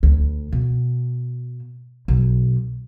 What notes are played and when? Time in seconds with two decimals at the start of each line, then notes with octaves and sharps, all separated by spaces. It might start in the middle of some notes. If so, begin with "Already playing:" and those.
0.03 D2
0.53 B2
2.08 B1